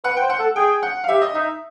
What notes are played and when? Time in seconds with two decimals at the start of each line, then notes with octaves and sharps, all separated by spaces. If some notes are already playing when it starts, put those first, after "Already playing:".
0.04 B4 F#5
0.17 C5 G5
0.30 F#5
0.39 A4
0.56 G#4 G5
0.83 F#5
1.04 F5
1.08 G4 E5
1.22 D#5
1.35 D#4 E5